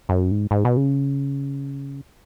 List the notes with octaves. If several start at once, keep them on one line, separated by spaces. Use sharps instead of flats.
F#2
G#2
G#2
B2
C#3